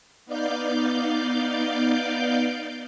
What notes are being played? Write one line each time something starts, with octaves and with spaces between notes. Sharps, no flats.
B3 D#4 D5 F5 D6 G6